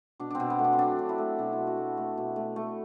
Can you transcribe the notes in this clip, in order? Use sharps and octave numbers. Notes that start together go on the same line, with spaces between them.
B2 D4
C4 D4
B2
B3
A3
D4
C4
F#3 D4
F#3
E4
A3
B2 D4
E4
B2
F#4
A3
A3
B2
A3
A3